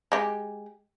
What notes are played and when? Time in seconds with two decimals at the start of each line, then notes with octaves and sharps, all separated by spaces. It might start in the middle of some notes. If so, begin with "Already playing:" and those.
0.12 G#3 G4